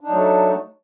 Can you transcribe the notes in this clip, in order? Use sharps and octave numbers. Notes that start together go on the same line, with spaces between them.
F#3 A3 D4 D#4